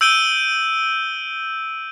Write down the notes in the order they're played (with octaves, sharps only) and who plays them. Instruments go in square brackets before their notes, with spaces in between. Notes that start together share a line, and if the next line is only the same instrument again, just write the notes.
[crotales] E6 G6 D7 D#7 G7